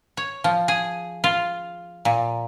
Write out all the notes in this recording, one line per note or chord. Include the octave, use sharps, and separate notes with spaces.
C#5
F3
G#4
F4
A#2